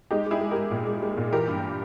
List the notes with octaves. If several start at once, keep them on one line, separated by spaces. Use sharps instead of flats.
G#3 D#4 G4
G#3 E4 G#4
G#3
G#3 G4 A#4
A#2
G#3
G#3
A#2
E3 G4 A#4
G2